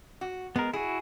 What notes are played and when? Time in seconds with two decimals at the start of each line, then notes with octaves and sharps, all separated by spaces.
0.21 F#4
0.56 G#3 B3 A#4
0.73 E4 F#4 G#4